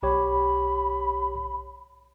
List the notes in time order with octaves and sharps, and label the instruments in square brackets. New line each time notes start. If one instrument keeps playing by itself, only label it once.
[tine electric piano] B1 G4 C#5 [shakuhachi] B5